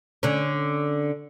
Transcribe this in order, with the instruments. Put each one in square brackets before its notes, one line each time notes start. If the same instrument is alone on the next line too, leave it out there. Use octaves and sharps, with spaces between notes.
[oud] D3 C#4